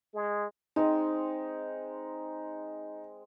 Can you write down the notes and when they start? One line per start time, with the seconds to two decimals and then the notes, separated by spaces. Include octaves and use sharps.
0.14 G#3
0.76 G#3 C4 D#4 G5